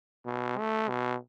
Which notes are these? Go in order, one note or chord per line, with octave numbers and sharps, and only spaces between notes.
B2
A3
B2